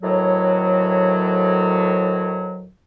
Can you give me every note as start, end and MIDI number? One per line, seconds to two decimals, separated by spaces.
0.02 2.68 38
0.02 2.68 45
0.02 2.68 51
0.02 2.68 54